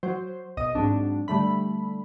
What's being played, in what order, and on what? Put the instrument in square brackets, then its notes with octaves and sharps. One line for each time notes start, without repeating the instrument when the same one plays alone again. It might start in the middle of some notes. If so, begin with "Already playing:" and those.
[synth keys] F#3 C5
B1 D#5 D#6
G#2 F#3 C4 D4
D3 G3 A3 B5